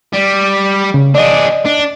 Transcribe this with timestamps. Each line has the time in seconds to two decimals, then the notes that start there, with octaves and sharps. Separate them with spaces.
0.13 G3
0.94 C#3
1.15 D4 G#4 D5 D#5
1.65 D4